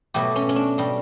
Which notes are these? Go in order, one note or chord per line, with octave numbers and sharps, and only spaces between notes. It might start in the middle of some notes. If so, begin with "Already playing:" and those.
B2 F#3 A3 G4
C#4
C#4
D4
B2 G3